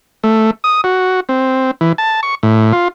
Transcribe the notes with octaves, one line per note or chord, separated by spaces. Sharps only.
A3
D#6
F#4
C4
E3
A5
C#6
A2
F4